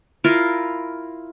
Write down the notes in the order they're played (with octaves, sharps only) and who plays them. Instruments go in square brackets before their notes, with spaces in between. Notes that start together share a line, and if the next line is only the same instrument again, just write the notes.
[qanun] E4 F4 A#4 F5